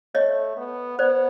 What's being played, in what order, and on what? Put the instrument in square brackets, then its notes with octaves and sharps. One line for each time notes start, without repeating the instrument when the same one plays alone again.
[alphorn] A3 [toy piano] C#5 D#5
[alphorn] B3
[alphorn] B3 [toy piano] C5 D5